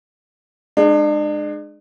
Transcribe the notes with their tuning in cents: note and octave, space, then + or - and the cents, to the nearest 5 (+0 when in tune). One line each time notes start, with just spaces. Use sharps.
G#3 +0 D4 +40